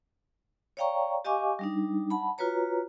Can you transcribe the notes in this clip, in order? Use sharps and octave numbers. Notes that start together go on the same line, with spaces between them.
C#5 D5 F5 G5 A#5 C#6
G4 D#5 F5 G#5 C#6 D6
G3 D4 D#4
F#5 A5 B5
F4 F#4 B4 C#5 A#5